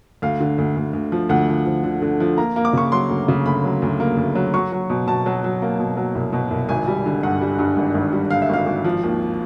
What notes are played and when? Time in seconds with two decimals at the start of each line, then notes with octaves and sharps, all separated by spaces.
0.22 D2 F5
0.40 D3
0.58 D2
0.77 D2
0.93 D2
1.12 F3
1.29 D2 F#5
1.49 F3
1.66 F3
1.83 D3
2.02 D3
2.20 F3
2.37 A#3 A#5
2.56 A#3
2.65 D6
2.73 C#3 C#6
2.92 F#3 C6
3.10 D2
3.28 C#3
3.46 D2 B5
3.64 F#3
3.82 D2
4.00 A#3
4.17 D2
4.35 F#3
4.54 F#3 C#6
4.72 F#3
4.90 B2
5.07 B2 A5
5.26 F#3
5.44 F#3
5.62 A#3
5.79 B2
5.97 F#3
6.15 C2
6.33 B2
6.51 C2
6.69 G#1 G#5
6.88 G3
7.06 D3
7.23 G2 F#5
7.41 G3
7.59 G2
7.77 G#1
7.94 G#1
8.13 G3
8.31 D3 F5
8.42 E5
8.49 G#1 F5
8.66 G#1
8.84 F3
9.03 D#2